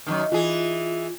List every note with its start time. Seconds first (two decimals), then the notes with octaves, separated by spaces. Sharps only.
0.07 F#2 B2 D#3
0.32 E3 F4 G#4